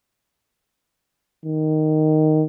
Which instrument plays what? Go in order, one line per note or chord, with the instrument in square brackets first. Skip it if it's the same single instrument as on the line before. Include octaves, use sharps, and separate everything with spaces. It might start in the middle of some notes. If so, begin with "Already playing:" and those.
[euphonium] D#3